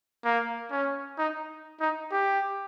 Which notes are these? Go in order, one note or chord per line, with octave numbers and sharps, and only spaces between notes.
A#3
C#4
D#4
D#4
G4